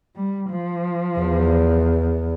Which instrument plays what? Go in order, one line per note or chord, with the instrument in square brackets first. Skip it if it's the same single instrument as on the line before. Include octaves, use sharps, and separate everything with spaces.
[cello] G3
F3
[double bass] E2